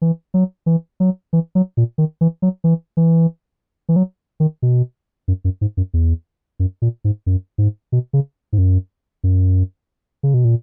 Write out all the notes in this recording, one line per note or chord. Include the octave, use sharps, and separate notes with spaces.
E3
F#3
E3
F#3
E3
F#3
A#2
D#3
E3
F#3
E3
E3
E3
F#3
D#3
B2
F#2
F#2
G#2
F#2
E2
F#2
A#2
G#2
F#2
G#2
B2
C#3
G#2
F#2
F#2
C#3
B2
A#2